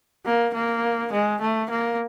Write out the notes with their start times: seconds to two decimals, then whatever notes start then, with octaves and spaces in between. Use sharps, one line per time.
0.26 A#3
0.54 A#3
1.13 G#3
1.41 A3
1.70 A#3